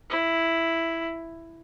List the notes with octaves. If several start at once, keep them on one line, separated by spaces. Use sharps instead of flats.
E4